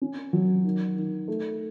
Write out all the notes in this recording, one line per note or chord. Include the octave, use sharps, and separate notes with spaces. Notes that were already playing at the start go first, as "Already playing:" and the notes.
C#4
F#3
D#3
D#3
A3